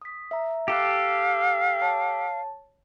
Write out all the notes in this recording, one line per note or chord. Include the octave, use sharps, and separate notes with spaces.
D#6 B6
E5 A#5
G4 A4 F5 D6 F#6
C#5 A5